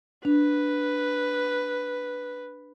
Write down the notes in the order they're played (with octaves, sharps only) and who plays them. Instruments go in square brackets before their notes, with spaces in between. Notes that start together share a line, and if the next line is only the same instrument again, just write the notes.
[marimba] D4 [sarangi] B4